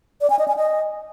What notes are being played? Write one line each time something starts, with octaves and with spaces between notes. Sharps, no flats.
D5
G#5
D#5
G#5
D#5